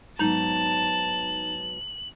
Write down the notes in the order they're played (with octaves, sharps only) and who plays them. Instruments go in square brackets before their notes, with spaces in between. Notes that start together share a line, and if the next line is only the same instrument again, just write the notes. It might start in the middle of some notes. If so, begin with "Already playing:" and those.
[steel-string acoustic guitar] G#2 F#3 B3 [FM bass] D#4 [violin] A5 [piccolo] F#7